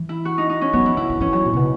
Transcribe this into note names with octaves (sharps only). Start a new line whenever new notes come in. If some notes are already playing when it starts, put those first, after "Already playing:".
Already playing: E3
E4
F#4
D#4
D#4
C#4
F#3 B3
E3 E4
D#3 E4
D#3
E3 C#4
F#3
A#2
C#3
B2